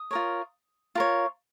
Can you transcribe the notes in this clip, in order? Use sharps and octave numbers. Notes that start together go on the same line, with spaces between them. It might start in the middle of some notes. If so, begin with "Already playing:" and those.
Already playing: D#6
F4 A#4 C#5
F4 A#4 C#5